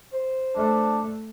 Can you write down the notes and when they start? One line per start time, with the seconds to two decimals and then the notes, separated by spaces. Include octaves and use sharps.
0.13 C5
0.56 A3 D4